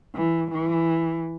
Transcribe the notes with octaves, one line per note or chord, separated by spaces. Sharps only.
E3
E3